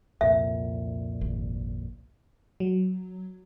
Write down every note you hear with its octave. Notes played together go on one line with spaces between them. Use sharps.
C2 F2 A#2 E5
G#1
F#3